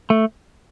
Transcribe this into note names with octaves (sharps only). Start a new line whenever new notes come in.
A3